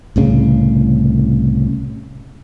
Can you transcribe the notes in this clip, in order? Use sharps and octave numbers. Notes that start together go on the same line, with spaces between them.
C2 A2 C#3